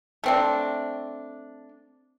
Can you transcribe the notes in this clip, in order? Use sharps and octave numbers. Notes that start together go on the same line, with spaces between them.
A3 C4 D4